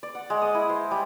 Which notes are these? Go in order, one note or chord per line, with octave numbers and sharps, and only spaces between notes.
D5
F#5
G#3
D#6
E4
C5
G3